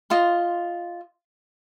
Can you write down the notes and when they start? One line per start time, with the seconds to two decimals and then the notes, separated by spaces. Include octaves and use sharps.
0.10 F4 D#5 C6